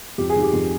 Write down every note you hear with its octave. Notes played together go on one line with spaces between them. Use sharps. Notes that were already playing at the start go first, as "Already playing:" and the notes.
F2 G4
G#4
D#3
G4
F2